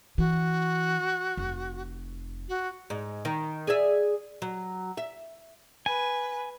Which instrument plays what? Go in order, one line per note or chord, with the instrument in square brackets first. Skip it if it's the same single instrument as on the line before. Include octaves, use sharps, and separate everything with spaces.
[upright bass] E3 [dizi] F#4
[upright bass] F1
[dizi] F#4
[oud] G#2
D#3
G#4 D5 E5
F#3
E5
[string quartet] B4 [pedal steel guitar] G#5